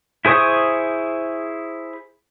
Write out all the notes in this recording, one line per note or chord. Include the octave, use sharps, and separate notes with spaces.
E4 G#4 C5 C#6 D#6